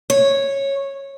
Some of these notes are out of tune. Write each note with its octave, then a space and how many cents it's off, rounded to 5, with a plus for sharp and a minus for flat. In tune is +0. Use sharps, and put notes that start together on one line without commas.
C#5 -10